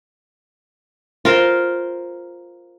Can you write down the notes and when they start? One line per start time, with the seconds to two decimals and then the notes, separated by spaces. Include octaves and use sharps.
1.25 F4 A#4 C5